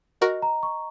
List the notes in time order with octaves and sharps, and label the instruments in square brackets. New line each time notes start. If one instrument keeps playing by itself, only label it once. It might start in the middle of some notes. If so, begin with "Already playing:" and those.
[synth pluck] F#4 A#4 [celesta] D#5
[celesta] A#5
C#6